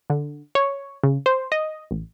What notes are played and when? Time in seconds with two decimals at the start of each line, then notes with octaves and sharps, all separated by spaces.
0.10 D3
0.55 C#5
1.04 C#3
1.26 C5
1.52 D#5
1.91 A1